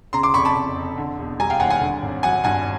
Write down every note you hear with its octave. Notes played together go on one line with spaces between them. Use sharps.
C#3 A#5 C6
C6 D6
F1 B5 C#6
A5 B5
F1
F2
D3
E1
G3 G#5 A#5
F5 G5
D#2 F#5 G#5
F#5 G#5
D3
G#1
F#3 F#5 G#5
G2 F#5 G#5